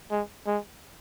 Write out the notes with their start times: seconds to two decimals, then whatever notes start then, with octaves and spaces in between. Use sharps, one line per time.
0.11 G#3
0.47 G#3